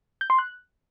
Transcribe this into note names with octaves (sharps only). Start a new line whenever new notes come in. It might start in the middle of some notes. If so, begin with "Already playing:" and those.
G6
C6
F#6